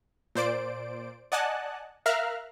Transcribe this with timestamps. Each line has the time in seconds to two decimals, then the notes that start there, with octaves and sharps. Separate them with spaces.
0.35 A#2 C5 D5 D7
1.32 D5 D#5 F#5 G#5 A5 F#6
2.06 A#4 E5 F5 A#5 F6 F#6